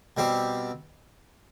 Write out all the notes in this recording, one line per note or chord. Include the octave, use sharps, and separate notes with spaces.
B2 G3 C4 G4